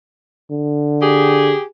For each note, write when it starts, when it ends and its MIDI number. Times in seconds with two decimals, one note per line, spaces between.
0.51 1.54 50
1.02 1.64 67
1.02 1.64 68